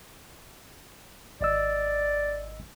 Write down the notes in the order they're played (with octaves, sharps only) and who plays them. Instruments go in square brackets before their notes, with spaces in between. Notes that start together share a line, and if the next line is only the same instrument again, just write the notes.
[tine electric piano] G#1 D#5 E6 [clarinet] D5